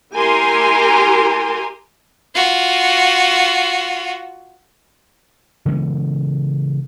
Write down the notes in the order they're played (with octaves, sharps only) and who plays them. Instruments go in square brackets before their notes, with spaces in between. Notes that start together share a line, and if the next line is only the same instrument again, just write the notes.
[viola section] E4 G4 A#4 G#5 A#5 C6
[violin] F4 F#4
[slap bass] C#3 E3 G#3 B3